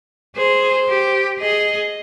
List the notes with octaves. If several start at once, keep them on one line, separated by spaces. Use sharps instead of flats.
G#4 C5
G4
G#4 D#5